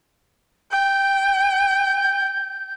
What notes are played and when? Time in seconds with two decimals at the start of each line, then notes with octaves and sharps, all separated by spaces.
0.71 G5 G6